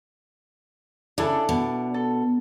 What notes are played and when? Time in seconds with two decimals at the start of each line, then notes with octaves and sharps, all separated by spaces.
1.18 C#3 D4 E4 A4
1.49 B2
1.94 A4